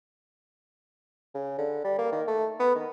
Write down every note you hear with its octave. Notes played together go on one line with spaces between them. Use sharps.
C#3
D3
G3
A#3
D#3
A3
B3
D#3